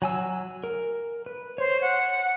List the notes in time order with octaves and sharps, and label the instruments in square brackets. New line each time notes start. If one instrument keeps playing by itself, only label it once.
[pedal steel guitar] F#3 G#5 E6
A#4
B4
[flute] C5 [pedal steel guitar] C#5
[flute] F#5